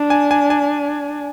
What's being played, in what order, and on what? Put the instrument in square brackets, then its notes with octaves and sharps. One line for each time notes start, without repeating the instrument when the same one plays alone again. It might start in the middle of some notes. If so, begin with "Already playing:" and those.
Already playing: [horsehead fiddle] D4
[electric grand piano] G#5
G#5
G#5